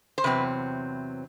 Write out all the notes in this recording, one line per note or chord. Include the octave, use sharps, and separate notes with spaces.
C5
E2 C3 F#3 C4 B4